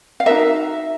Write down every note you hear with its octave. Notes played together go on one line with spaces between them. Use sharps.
F5
D#4 F#4 A#4 E5